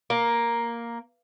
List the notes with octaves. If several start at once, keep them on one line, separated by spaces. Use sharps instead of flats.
A#3